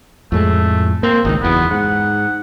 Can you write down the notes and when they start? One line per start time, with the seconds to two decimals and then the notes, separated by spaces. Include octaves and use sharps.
0.32 F2 A2 G#3 A3
1.03 A#3 C4
1.25 G#1 C#2 D#3 D#4
1.41 F#1 E2 B3
1.71 G#2 F#5